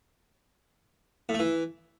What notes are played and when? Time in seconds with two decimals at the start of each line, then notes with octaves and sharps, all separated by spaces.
1.29 A2
1.34 A3
1.39 E3